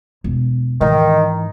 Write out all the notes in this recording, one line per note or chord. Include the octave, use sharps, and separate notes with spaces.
E1
G#2 D#3 E3